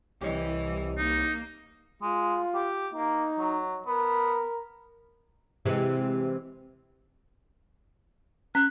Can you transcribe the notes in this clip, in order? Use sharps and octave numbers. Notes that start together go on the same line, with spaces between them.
C2 E3 G4 C#5 D#5
A#3 D#4
G#3 F4
G4
A#3 D#4
F#3
B3 A#4
C3 E3 G#3
C#4 F#6